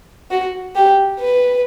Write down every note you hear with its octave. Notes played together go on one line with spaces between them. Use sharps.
F#4
G4
B4